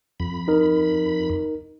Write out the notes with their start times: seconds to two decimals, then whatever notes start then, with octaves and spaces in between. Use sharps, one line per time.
0.20 F2 B5
0.48 D#4 A#4